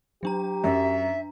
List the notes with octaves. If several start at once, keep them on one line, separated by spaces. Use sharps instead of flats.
F#3 D4 G4 A#5
F#2 E5